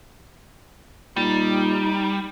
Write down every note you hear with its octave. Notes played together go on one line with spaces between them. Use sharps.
A#2 G3 D#4